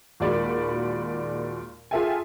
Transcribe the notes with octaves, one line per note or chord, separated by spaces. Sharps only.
D#2 A#2 G#3 F#4 D5 B5
F4 G#4 A4 E5 G5 G#5